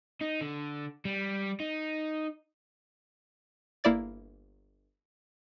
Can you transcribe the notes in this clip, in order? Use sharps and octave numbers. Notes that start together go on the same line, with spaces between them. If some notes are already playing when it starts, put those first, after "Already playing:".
D#4
D3
G3
D#4
G1 A#3 E4 D5 A6